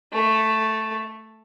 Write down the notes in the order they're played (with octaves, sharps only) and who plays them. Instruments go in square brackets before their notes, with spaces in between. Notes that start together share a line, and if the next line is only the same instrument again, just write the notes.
[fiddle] A3